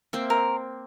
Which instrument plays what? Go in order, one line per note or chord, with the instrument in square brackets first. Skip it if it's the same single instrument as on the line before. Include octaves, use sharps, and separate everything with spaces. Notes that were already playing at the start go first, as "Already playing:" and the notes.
[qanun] A#3 C4 [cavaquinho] E5
[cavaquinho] A#4